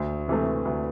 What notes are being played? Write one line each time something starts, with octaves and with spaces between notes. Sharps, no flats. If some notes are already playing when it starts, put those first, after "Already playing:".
Already playing: D2
C3 E3 A3
D2